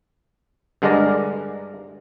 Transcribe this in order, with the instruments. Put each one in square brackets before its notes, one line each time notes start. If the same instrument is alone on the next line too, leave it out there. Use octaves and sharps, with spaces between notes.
[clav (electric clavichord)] G2 D3 G#3 A#4 D5 A#5